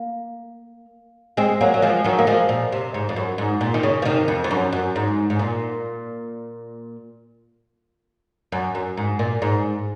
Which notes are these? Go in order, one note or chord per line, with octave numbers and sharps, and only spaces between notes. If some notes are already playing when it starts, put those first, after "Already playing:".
Already playing: A#3
G#3 C4
F#3 A#3
F#3
F3 G#3
D#3 F#3
A#3
F3 G#3
A#2
C3
G#2
F2
F#2
G#2
A#2
D#3
C#3
F3
C3 D#3
F2
F2
F#2
F#2
G#2
G#2
A#2
F#2
F#2
G#2
A#2
G#2